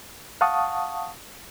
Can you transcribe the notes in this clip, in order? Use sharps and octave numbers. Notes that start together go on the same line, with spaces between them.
F5 F#5 A5 C#6 D#6